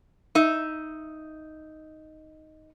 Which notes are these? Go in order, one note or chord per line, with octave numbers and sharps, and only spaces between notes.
D#4 E5